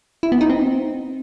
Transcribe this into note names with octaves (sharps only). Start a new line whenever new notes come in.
E4
B3
D#4
C4